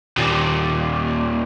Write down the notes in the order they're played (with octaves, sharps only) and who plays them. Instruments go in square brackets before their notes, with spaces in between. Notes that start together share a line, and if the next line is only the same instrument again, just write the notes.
[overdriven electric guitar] D#2 A#2